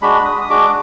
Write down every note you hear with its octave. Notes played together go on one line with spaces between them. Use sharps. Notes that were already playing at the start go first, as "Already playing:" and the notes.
G#3 D4 F#4 B5
D#6
D#6
G#3 D4 F#4 D6